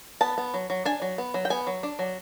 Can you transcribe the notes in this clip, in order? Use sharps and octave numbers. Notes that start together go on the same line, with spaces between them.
B3 A5
B3
F#3
F#3
D4 G#5
F#3
B3
F#3
G5
B3 G#5
F#3
D4
F#3